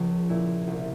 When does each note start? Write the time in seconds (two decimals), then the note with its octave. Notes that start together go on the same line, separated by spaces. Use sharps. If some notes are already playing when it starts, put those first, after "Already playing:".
Already playing: C#2 F3 A#3
0.29 A#2 E4
0.67 C2